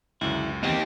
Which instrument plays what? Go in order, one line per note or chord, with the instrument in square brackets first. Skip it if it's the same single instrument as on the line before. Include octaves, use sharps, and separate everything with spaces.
[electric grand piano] C#2 F#2 [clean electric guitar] D3 E4
[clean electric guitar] E2 D#3 C4 [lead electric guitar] D#4 G4